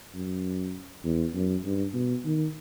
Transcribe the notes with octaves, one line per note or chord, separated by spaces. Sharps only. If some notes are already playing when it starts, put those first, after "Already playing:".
F#2
E2
F#2
G2
B2
D#3